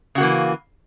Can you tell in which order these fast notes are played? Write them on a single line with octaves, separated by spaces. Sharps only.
C#3 F#4 A#3 E3